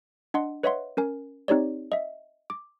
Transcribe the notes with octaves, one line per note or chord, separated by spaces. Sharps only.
D4 D#5 F#5 C6
B4 C#5 D#5 E5 F#5 C6
C#4 A#4 G#5
C4 D#4 G4 C#5 D5
D#5 E5
D6